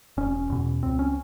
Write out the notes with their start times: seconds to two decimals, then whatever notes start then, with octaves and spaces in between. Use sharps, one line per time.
0.17 E1 C#4
0.50 E2 B2
0.83 C#2 C4
0.99 C#4